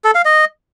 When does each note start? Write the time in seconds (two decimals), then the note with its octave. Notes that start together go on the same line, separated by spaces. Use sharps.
0.04 A4
0.15 F5
0.25 D#5